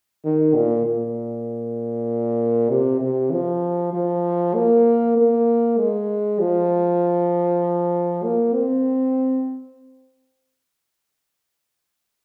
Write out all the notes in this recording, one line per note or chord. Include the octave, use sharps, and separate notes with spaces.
D#3
A#2
A#2
C3
C3
F3
F3
A#3
A#3
G#3
F3
A#3
C4